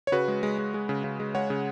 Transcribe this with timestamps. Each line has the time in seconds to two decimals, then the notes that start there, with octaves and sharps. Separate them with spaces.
0.07 C#5
0.12 C#3 F#4 B4
0.28 G#3
0.43 G#3
0.58 G#3
0.74 G#3
0.89 C#3
1.04 C#3
1.20 G#3
1.35 G#3 C#5 F#5
1.50 C#3